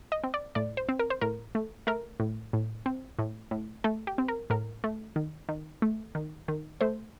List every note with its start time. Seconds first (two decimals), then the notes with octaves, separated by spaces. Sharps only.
0.12 D#5
0.24 C4
0.34 D5
0.55 A2 D5
0.77 C5
0.89 C4
0.99 A#4
1.10 C5
1.21 A2 A#4
1.55 A3
1.87 A3 A#4
2.20 A2
2.53 A2
2.86 C4
3.19 A2
3.51 A2
3.84 A3 A4
4.07 G4
4.18 C4
4.28 A#4
4.50 A2 A#4
4.84 A3
5.16 D#3
5.49 D#3
5.82 A3
6.15 D#3
6.48 D#3
6.81 A3 C5